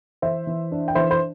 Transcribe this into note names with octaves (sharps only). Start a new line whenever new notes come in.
E3 C5 E5
E3
D4
G5
E3 C5 E5
C5